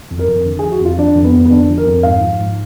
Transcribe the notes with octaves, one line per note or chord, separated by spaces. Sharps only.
F2
A#4
F2
D3
F3 G#4
F#4
F2 F4
F3 D4
F2
B3
F2
B3
D3 D4
F3
A#4
F2
G#2 F5
F3
G#2